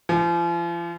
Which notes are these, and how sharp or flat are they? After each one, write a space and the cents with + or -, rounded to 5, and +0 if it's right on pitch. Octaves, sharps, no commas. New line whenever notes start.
F3 -40